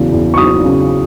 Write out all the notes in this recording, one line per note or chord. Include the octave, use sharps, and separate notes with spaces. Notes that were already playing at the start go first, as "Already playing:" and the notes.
Already playing: E2 C#3 F#3
E2
C#6
F#3 D#6
C#3